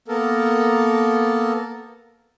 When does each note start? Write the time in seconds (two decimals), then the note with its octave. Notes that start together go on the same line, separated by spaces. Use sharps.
0.08 A#3 B3 A4 A#4